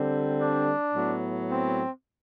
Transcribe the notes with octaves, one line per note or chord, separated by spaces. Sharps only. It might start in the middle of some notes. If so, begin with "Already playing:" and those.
Already playing: D3 G3 C4
D4
A2 F#3 B3
C4